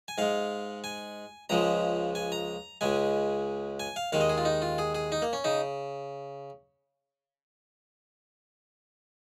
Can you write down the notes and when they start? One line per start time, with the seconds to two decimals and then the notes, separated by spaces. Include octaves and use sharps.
0.08 G#5
0.18 G#2 G#3 F5
0.84 G#5
1.49 C#2 C#3 F3 G#3 A#5
2.15 G#5
2.32 A#5
2.81 C#2 C#3 G#3 G#5
3.80 G#5
3.96 F5
4.12 D#2 D#3 G#3 F5
4.21 D#5
4.29 G#4
4.38 F4
4.45 D#4
4.62 F4
4.78 G#4
4.95 G#4
5.12 D#4
5.22 A#3
5.33 C#4
5.44 C#3 D#4